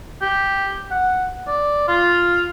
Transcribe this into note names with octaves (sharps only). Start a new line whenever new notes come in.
G4
F#5
D5
F4